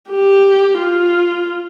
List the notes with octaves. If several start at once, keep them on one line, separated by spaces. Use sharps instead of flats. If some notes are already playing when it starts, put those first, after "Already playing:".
G4
F4